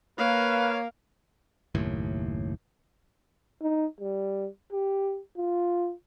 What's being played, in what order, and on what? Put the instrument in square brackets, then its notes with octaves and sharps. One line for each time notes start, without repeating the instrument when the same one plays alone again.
[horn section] A#3 [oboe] B4 [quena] C#5 [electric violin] F5
[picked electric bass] F#1 D#2 A2
[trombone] D#4
G3
G4
F4